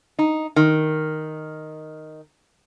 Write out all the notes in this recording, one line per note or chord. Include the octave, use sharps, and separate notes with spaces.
D#4
D#3